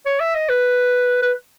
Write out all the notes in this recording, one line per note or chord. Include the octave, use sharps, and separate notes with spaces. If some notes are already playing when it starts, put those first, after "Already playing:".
C#5
E5
D#5
B4
B4